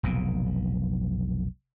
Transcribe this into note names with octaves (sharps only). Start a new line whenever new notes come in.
F1 B1 A#2